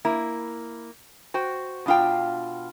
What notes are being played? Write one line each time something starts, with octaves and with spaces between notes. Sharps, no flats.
A#3 E4
F#4 C5 G5
B2 D4 F4 F5 G5